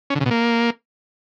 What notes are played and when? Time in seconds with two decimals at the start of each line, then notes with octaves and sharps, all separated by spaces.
0.10 C#4
0.15 D3
0.20 C#3
0.26 B2
0.31 A#3